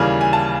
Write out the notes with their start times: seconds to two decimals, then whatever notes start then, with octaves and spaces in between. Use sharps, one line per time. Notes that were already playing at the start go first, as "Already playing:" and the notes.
Already playing: D#2 C#3 E3 G3 A#3 G#5
0.21 G#5
0.33 A5